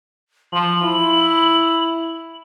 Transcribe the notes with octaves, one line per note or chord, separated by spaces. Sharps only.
F3 F#7
E4